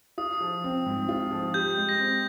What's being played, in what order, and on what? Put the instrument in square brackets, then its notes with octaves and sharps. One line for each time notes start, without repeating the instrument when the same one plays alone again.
[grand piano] F4 [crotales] D#6
[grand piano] F3
C4
G#2
F4
F3
[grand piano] G4 [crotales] G6
[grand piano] G#3
[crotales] A#6
[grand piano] C4